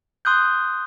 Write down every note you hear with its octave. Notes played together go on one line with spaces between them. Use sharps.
C6 D#6 F#6 G6